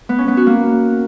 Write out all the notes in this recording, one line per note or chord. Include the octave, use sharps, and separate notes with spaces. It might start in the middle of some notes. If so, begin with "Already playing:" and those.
B3
C#4
B3
F#4
A#3